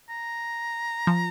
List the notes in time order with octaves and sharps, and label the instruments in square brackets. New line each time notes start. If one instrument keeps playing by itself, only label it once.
[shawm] A#5
[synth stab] F3